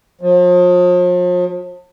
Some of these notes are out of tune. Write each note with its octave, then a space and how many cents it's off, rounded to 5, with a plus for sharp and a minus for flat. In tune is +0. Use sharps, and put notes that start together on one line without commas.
F3 +40